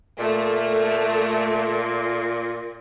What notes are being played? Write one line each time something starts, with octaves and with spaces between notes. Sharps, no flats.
A#2 A3